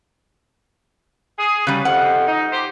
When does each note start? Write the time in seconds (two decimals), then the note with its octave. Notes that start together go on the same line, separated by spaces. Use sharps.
1.38 G#4
1.67 C#3 F#3 G3 B4
1.85 F2 C3 F#5
2.27 D#4
2.52 G4 C5